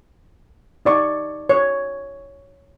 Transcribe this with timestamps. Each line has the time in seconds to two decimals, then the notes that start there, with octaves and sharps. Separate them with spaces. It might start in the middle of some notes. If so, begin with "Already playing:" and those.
0.85 D#4 D5 C#6
1.49 C#5